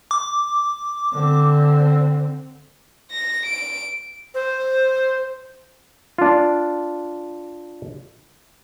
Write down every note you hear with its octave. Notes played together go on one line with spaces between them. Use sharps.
D6
D3 C4
A#6
D7
C5
D4 F4